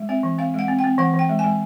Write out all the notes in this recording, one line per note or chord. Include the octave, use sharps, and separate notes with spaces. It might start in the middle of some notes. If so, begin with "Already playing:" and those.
Already playing: G#3
C4 E5
E3
C4 F5
G#3 F#5
C4
G5
C4
E3 F#5
E3
G5
G#3
G#5
G#3